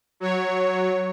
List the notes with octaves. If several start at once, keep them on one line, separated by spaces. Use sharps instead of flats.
F#3 C#5